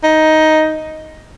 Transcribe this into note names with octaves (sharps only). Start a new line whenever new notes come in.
D#4